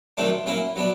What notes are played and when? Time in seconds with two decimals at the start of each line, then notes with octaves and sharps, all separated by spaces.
0.17 C3 D#3 F#3 A3 D4
0.46 F#3 A#3 C#4 E4
0.76 F#3 B3 D4